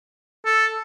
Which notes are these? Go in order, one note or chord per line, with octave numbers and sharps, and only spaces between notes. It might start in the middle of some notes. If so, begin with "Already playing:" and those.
A4